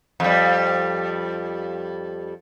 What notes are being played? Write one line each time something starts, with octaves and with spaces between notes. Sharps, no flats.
F2 G3